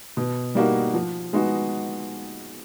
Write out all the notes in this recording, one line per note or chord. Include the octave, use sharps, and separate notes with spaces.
B2
G3 A#3 D#4 F#4
F3
G#3 B3 D#4 F#4